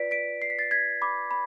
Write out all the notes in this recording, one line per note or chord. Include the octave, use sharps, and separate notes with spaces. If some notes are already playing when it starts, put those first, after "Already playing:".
Already playing: F4 B4 D5 B6 D7
B6 D7
C7
B6
A6 C7
G#6 B6
B5 D6
B5